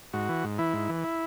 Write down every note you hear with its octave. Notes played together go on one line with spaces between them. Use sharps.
G#2 F#4
E3
G#2
E3 E4
G#2
E3
E4